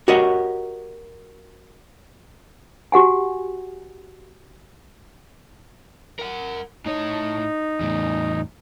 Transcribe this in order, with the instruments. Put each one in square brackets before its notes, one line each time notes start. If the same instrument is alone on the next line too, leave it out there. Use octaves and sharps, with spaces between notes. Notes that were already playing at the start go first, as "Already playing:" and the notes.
[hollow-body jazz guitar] F#4 G4 A#4 C#5 D#5 F#5
[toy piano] F#4 G4 F#5 G#5
[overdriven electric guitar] A#4 F#5
[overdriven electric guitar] A2 C#5 [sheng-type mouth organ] D#4
[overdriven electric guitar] E2 A2